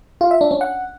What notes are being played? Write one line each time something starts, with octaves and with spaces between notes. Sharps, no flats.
F4
E5
D4
C#4
F#5